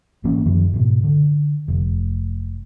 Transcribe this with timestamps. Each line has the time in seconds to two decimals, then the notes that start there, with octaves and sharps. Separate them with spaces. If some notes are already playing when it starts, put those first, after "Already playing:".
0.24 G#1 E3 A#3 C#4
0.46 F#2 D#3 F3
0.74 G#2 B2
1.04 D3
1.68 F1